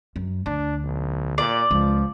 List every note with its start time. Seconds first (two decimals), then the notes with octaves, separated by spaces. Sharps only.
0.16 F#2
0.46 D2 D4
0.84 B1
1.38 A#2 D5
1.71 C#2 F3